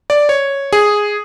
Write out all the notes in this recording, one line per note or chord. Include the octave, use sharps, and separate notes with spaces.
D5
C#5
G#4